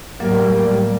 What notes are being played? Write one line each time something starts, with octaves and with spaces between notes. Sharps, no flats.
A2 F#3 G3 A#3 A#4